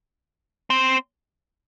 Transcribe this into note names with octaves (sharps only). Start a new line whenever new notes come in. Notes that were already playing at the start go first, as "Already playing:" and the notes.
C4